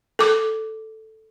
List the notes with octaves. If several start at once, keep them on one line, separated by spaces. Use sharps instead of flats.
A4 D6